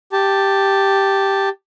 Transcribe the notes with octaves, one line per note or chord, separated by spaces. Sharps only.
G4 A5